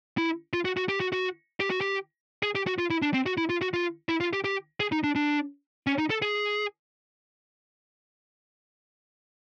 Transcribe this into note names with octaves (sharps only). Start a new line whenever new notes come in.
E4
F4
F#4
F#4
G4
F#4
F#4
G4
F#4
G4
G#4
G4
F#4
F4
E4
D4
C4
F#4
E4
F4
F#4
F4
E4
F4
G4
G4
G#4
D#4
D4
D4
C#4
D#4
A4
G#4